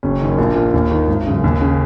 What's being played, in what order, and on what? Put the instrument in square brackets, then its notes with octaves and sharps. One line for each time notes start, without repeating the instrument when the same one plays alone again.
[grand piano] F#1 C#4
F#2 D#3
A#1 A#3
A#2
D#2
D#3
G#1
F#2 C#3
D#2
C#3